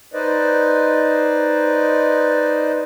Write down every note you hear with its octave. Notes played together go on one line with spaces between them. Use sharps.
D#4 B4 C5 D5 D#5